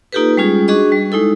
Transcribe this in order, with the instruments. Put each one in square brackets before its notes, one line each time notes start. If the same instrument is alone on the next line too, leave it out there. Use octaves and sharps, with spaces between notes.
[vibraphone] A#3 D#4 F4 G4 A4 B4
G3 G#3 C#4 F4 G#4
D4 F#4 G#4 D#5 C#6
G3
G#3 D#4 E4 A4